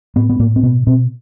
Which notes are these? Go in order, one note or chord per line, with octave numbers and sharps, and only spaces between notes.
A2 B3
B3
A2 A#3
C4
B2 B3
B2 C4